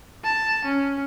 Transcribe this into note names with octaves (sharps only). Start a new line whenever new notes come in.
A5
C#4